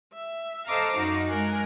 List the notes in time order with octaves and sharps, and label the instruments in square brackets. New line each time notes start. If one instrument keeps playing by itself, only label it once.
[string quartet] E5
A4 C5 D#5 F5 A#5 D6
F#2 D#4 F#4
G#3 A#4 G#5 F#6